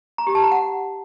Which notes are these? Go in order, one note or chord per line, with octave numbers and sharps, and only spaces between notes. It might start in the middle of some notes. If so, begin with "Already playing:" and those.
A#5
G4
A5
A#5
F#5